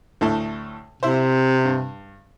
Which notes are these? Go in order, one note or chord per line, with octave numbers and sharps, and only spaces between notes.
D2 A2 A3
C3 E4 C5
G2